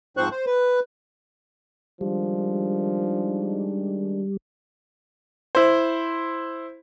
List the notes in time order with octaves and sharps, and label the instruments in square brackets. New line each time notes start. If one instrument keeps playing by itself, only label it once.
[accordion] G#2 F3 C4 C5 C#6 F#6
C5
B4
[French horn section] D#3 G#3 D4 [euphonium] F3 [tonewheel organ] G3
[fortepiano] E4 C5